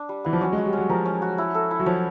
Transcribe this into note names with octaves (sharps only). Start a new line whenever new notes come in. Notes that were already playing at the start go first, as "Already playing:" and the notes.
Already playing: D4
G3
E3 B3
F3
F#3 C#4
G#3
F#4
G3
F#3 C#4
F3 A#4
C#4
F#4
E4
A4
E4
F#3
F3 C#5